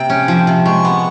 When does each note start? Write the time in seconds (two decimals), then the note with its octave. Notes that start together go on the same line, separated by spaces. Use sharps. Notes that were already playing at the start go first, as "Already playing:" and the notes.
Already playing: C3 A#3 G5
0.10 C#4
0.28 F3
0.47 C3
0.66 G#3 C#6
0.85 B3